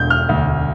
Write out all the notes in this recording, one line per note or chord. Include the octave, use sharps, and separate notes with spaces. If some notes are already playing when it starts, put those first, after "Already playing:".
Already playing: E1 D3 G6
F6
D2